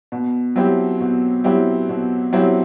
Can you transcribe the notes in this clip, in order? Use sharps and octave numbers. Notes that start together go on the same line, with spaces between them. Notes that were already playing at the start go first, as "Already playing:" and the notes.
B2
F#3 C4 E4 G4
B2
F#3 C4 E4 G4
B2
F#3 C4 E4 G4